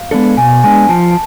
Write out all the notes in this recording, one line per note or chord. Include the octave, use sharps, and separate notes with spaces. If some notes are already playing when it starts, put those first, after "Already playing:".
Already playing: F5
G#3 B3 D4 A4
B2 G#5
G#3 B3 D4 G#5
F3 A5
A5